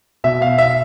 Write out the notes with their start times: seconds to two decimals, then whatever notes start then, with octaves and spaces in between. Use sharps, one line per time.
0.24 B2 E5
0.42 F5
0.58 E5